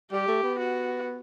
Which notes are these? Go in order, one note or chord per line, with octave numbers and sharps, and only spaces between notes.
G3 G4
A3
B3
F#4